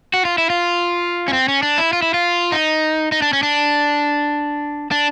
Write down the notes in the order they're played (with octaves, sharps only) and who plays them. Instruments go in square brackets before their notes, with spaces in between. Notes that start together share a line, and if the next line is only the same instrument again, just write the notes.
[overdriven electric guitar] F#4
F4
E4
F4
C#4
C4
C#4
D4
E4
F4
E4
F4
D#4
D#4
D4
C#4
D4
D4